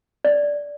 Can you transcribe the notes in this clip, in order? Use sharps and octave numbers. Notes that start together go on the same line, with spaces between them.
D5